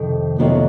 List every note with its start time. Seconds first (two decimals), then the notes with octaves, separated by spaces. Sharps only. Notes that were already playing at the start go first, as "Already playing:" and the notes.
Already playing: F2 C3 D#3
0.38 F2 C3 D#3 F#3 B3